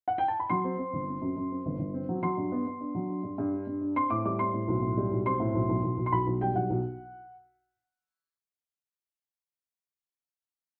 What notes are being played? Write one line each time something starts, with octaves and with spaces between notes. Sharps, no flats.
F#5
G5
A5
B5
F#3 C6
C4
C4
G1
C4
F#2
F#2
C4
G1
G1
C4
F#3
F#3 C6
G2
B3
B3
D4
F#3
D4
G2
G2
D4
G2
D4
C4 C6
A2 D6
G3 D6
C4 C6
A2
B1
A2
G3
B1
C4 C6
A2
B1
B1
B1
B1
C6
B1 B5
B1
G3 G5
B1 F#5
B1